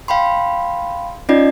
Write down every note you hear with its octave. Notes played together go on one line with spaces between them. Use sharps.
F5 G5 B5 C6
C#4 D#4 F4 D5 D#5